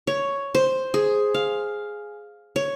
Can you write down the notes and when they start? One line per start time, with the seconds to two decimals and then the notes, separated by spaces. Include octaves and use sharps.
0.07 C#5
0.55 C5
0.94 G#4
1.34 F5
2.56 C#5